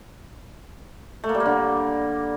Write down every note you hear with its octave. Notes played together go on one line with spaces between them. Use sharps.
A3
A#3
G3
A#3
D3